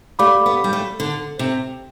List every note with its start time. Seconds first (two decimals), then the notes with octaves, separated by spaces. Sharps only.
0.19 A3 G4 D5 F5 B5 D6
0.46 B3
0.64 G3
0.73 A3
1.00 D3
1.39 C3